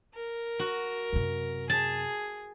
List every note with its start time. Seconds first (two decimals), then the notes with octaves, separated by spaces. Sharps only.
0.14 A#4
0.59 F#4
1.13 F#2 C3
1.70 G#4 A5